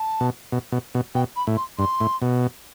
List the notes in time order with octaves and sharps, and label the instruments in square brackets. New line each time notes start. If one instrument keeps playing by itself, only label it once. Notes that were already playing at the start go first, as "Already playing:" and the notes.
Already playing: [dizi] A5
[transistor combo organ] B2
B2
B2
B2
[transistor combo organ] B2 [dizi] G5
[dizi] B5
[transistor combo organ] A2
[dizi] C6
[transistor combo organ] G2 [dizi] C6
[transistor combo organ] A2
B2